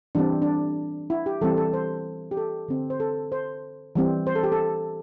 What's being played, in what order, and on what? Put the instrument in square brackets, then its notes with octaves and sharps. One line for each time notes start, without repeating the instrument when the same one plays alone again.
[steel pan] E3 G3 C4 D4
D4
E4
G4
E3 G3 C4 A4
A4
C5
G4
A4
D3 C4
C5
A4
C5
E3 G3 C4
C5
A4
G4
A4